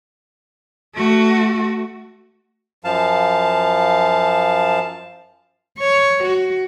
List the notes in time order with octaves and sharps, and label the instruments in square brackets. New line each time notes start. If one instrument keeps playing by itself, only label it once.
[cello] A3 F#4
[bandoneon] F#2 F3 F5 A5
[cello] C#5
F#4